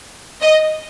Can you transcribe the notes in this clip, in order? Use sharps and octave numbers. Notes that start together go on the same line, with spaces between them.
D#5